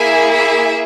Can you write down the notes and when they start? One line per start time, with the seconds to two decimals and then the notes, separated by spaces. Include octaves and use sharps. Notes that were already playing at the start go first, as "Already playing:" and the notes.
Already playing: A#3 E4 G#4 E5 G#5
0.32 E5 G#5